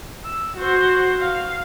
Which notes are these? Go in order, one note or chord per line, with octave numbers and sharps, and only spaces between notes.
E6
F#4 C5
F5